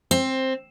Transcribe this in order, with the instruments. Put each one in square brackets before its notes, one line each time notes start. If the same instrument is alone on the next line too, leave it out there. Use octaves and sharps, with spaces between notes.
[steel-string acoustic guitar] C4